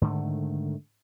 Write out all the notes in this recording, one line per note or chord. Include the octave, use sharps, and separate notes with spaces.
G#2 D3 D#3 A3